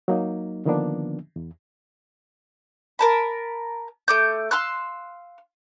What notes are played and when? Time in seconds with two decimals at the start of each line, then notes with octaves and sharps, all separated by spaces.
0.08 F#3 A#3 D#4
0.65 D3 D#3 F3 A#3 B3 D4
1.36 E2
2.99 A#4 A5 B5
4.08 A3 D6 G6
4.51 F5 C6 E6 F#6